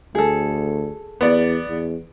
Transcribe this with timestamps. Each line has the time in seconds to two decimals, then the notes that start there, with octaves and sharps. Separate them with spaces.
0.15 D2 G#4 A4
1.21 E2 B3 D5
1.68 E2